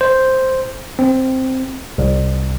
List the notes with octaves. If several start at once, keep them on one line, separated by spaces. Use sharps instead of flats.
C5
C4
C2